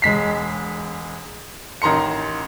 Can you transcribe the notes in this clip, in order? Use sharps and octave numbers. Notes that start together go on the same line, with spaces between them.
E1 G#3 B6 C7
A1 D#3 A#5 C6 C#7